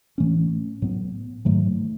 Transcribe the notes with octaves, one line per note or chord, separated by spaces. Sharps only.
A2 E3 A3 C#4
A2 F#3 B3
G#2 D#3 F#3 A3